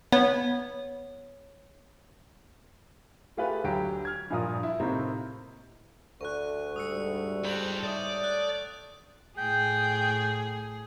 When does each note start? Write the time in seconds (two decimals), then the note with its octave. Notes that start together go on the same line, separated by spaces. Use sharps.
0.12 B3 C#5
3.37 A3 E4 F4 G4 G#4 B4
3.64 D2 F#3 G4 G#5 D7
4.05 F6 G#6
4.30 G2 A#2 F3 F4 A#4 D#6
4.63 E4
4.80 A2 C3 A#3 C4 D#4
6.21 D2 C#6 F#6
6.76 G#2 G3 D#6 E6 C#7
7.45 A4 C5 G6 F7 F#7
7.83 A2 A3 D5 D#6
8.24 F#6
9.38 A2 G#4 G5